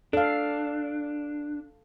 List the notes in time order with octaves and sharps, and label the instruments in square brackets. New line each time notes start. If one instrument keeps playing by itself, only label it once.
[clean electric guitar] D4 [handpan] A4 F5